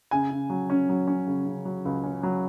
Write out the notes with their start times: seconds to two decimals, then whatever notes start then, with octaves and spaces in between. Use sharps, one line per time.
0.11 C#3 G#5
0.31 C#3
0.50 F#3
0.70 C#4
0.89 F#3
1.07 C#4
1.27 C#3
1.46 C#3
1.65 F#3
1.85 C#2
2.04 C#4
2.23 F#3